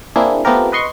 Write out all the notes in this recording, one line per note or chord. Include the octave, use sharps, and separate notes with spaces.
A#3 C4 D4 E4 G#4
A3 B3 C4 F4 G4 A#4
B4 D#5 C6 C#6